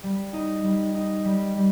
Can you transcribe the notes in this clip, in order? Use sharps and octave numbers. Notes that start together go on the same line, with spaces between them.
G3
D#4
G3
D#4
G3
G3